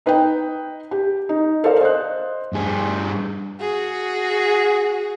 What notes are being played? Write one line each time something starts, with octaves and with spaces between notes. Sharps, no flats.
D#4 B4 D#5 G5
G4
D#4
A4 A#4 C5 D5 F5
C5 D#5 F#6
G2 G#4
F#4 G#4